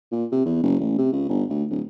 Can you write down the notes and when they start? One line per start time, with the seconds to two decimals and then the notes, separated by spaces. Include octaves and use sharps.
0.12 A#2
0.32 C3
0.45 E2
0.63 F#1
0.80 A1
0.98 C3
1.12 C#2
1.29 G1
1.50 D2
1.70 D1